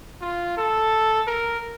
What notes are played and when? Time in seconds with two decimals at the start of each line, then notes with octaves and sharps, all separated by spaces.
0.21 F4
0.57 A4
1.27 A#4